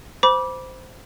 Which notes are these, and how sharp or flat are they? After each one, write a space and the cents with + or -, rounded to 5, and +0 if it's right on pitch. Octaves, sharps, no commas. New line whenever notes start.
C5 -15 B5 -25 D6 -10